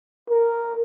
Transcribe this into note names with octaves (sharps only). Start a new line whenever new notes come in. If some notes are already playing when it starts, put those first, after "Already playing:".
A#4